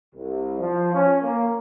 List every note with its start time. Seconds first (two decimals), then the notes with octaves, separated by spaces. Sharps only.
0.15 C2
0.59 F3
0.93 C#4
1.23 A#3